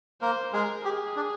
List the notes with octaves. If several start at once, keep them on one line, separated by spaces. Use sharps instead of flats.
A#3 A#4 C5
G#3 G#4 A#4
G4 G#4
D4